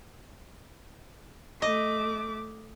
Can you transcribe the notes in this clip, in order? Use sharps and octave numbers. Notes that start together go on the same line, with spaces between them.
A3 D#5 D6